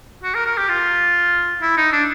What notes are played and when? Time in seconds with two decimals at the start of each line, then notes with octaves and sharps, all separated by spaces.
0.23 F#4
0.34 A#4
0.46 A#4
0.57 G4
0.69 F4
1.62 E4
1.77 D#4
1.92 D4